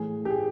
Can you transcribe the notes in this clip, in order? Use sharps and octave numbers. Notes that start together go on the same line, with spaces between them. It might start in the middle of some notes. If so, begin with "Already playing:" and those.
Already playing: A2 E3 G#4
G4
G#4